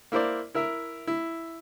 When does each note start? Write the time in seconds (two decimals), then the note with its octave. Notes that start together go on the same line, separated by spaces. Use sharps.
0.12 A#3 E4 A#4 C5 D5
0.55 E4 A#4 E5
1.07 E4